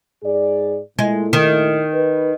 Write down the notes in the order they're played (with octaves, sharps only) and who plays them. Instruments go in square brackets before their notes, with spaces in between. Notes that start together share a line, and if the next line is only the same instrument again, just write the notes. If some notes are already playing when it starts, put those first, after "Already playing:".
[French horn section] G#2 G#4 D5
[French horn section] A#2 A3 E4 [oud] G#3
[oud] D#3
[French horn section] B4